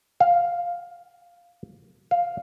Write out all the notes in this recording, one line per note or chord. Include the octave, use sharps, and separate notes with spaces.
F5
F5